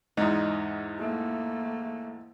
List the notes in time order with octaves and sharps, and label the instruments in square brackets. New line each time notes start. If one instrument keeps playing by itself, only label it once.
[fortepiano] E2 G#2 [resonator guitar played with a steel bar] D#4
[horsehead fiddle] A3 A#3